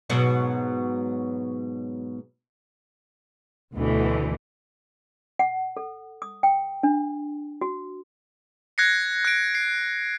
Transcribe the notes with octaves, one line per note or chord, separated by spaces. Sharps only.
G#2 B2 F#3
D2 B2 D3 E3 A3
F#5
A4
D#6
G5
D4
F#4
F#6 G#6 A#6 C7 C#7
F#6 D7
C7